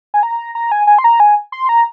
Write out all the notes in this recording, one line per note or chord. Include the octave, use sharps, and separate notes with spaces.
G#5
A#5
A#5
G#5
G#5
C6
A#5
G#5
C6
A#5